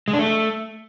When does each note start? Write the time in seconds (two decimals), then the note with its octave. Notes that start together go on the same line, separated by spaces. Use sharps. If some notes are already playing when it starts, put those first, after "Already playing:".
0.08 G#3
0.13 D4
0.19 A3